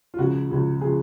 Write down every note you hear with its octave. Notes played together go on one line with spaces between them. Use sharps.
F4
C#2 C#3 F3 F#4
C#2 C#3 F3
C#3 F3 G#4